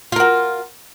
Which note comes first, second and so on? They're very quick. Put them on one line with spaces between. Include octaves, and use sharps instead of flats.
F4 A#4 F#4